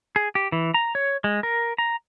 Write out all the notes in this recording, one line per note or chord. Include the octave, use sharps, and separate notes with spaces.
G#4
G4
E3
A#5
C#5
G#3
A#4
A#5